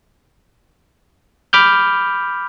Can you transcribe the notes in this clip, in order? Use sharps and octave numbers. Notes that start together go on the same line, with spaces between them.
B5 D6 F6 G6